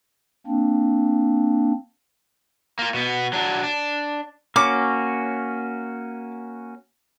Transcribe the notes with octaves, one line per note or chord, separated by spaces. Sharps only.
A#3 C4 D4
A#3 F4
B2 B3
F#3 D4
D4
A#3 C#4 F#4 D6